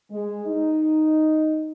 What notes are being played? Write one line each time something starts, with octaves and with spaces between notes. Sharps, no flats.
G#3
D#4